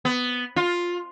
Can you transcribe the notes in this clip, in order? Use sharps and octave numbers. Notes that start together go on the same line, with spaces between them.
B3
F4